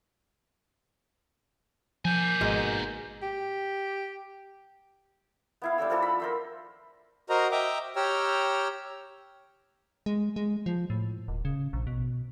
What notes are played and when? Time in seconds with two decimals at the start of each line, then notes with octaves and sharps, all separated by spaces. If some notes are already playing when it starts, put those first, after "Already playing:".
2.05 F3 A#3 G#5 G6
2.41 G#1 G#2 B2 G#4
3.22 G4
5.62 B3 E4 F5
5.78 G3 D4 A4 E6
5.90 F3 D4 A4 E6
6.02 B5
6.20 A#4 C5 E5
7.30 F#4 A#4 C5 D#5 A#5
7.51 D#5 E5 G5 A#5 D6
7.96 G4 C#5 G5 A#5 E6 F6
10.06 G#3
10.36 G#3
10.66 F3
10.90 A2
11.28 D#1
11.45 C#3
11.73 A#1
11.87 B2